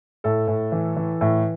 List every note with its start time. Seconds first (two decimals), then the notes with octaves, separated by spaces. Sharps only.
0.24 A2 A4
0.48 A2
0.72 E3
0.96 E3
1.21 A2